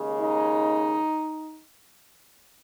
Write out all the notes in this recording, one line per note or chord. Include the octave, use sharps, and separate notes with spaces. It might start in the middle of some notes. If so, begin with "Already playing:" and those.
Already playing: D#2 C#3 G#3
D#4